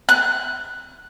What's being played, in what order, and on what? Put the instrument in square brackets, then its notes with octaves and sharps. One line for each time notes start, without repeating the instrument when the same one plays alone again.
[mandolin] F#6